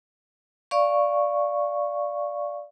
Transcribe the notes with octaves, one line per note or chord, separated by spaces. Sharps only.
D5 F5 C#6